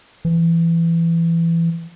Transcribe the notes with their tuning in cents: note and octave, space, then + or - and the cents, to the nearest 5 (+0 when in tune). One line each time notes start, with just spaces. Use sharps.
E3 +20